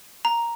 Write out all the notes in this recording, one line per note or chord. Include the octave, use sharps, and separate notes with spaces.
A#5